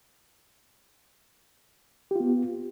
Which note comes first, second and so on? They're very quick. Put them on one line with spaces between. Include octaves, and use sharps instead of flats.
G4 F4 B3